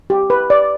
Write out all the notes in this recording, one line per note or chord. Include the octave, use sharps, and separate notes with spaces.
G4
B4
D5